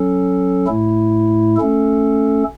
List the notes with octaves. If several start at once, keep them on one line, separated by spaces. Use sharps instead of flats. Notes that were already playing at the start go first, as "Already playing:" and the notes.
Already playing: F#3 C#4 A4
A2 A3 E4
A3 C#4 A4